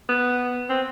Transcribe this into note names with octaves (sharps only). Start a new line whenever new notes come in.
B3
C4